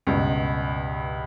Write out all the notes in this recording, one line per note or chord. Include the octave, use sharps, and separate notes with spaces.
C#2 G2 B2